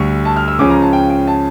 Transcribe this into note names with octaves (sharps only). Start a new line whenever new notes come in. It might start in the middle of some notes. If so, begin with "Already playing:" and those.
Already playing: D2 D3 G3 C#6
A5
F6
E6
C#2 C#3 F3 C#4 D6
A#5
A5
G5
G5
A5